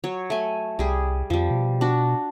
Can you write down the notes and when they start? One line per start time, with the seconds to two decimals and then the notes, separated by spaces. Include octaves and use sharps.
0.04 F#3 C#5
0.30 A3 G#5
0.79 C2 G3 G#4
1.30 F2 F3 G3
1.50 B2
1.81 D4 F#4